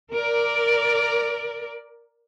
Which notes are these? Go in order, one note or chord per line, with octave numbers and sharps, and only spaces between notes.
A#4 D5